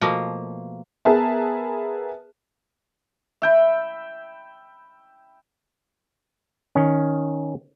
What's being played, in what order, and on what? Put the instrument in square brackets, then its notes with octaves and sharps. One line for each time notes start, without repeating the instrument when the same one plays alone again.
[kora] B2 F3 A3 A#3
[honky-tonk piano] B3 G#4 A#4 B4 E5 A5
[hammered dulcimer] E5 G5 B5
[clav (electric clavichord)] D#3 C#4